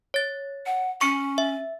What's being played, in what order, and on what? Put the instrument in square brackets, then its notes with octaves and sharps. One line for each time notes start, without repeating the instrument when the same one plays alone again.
[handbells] C#5 A6
[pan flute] F#5
[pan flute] C#4 [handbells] C#6 C#7
[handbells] E5